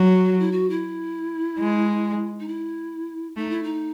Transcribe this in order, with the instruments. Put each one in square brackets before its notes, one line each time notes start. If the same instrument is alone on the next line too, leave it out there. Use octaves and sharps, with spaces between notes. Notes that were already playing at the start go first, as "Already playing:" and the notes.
Already playing: [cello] F#3
[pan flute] F#4
E4
F#4
E4
[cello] G#3
[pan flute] D#4
E4
[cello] A3 [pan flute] D#4
[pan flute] E4
D#4